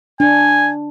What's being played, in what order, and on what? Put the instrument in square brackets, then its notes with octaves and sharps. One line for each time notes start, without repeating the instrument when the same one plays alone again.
[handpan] D4 [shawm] G#5